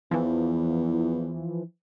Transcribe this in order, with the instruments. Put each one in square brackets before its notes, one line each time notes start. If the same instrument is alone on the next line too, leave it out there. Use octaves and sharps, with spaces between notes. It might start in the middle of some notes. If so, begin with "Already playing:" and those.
[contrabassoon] E2 [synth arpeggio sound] E3 F3